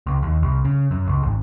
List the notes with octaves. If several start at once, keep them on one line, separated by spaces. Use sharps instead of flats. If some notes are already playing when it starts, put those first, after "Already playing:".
C#2
D#2
C2
C#3
F#2
C#2
G#1